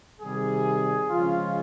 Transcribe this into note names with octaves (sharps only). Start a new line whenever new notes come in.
C3 D#3 G3 G#4
C#3 F3 G#3 C#4 F4